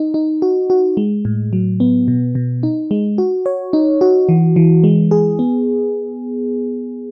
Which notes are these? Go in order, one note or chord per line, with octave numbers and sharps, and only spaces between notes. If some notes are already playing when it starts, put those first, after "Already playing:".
Already playing: D#4
D#4
F#4
F#4
G#3
A2
F#3
B3
B2
B2
D#4
G#3
F#4
C#5
D#4
F#4
E3
E3
G#3
G#4
B3